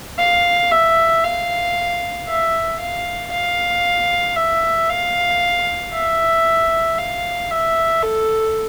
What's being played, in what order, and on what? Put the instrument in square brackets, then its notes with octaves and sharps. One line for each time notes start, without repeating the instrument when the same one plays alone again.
[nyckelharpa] F5
E5
F5
E5
F5
F5
E5
F5
E5
F5
E5
A4